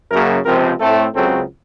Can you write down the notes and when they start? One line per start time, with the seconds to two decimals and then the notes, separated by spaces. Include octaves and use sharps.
0.11 F#2 C#3 F#3 A#3 A#4
0.46 C#2 C3 F3 C4 A#4
0.80 A2 A3 C4 A4
1.14 C#2 C#3 F#3 C4 A4